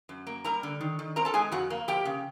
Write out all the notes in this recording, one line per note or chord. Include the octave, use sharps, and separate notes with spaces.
F#2
A#3
G3 A#4 A#5
D3
D#3
D#3
C4 A#4 A#5
A4 A5
G#3 G#4 G#5
F2 F#4 F#5
A#3
F3 G4 G5
C#3